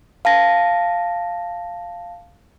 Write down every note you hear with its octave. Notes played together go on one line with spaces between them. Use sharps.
F5 A5 A#6